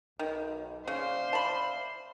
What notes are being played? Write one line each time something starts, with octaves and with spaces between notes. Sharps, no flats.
B1 D#3
C#3 C5 D5 E5 F5
A5 B5